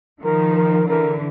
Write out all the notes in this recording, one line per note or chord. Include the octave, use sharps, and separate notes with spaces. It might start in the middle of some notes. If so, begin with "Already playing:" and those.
D#3 F3 A#4
A#4
D3 E3 A#4